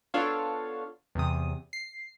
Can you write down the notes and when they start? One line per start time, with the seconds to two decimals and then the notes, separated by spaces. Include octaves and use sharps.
0.14 B3 D4 F4 A4 C#5 F5
1.15 E2 C3 D#6
1.73 C7